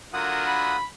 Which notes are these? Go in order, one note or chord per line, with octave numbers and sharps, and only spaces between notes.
D3 F#3 F4 A#4 F#5 D#6
B5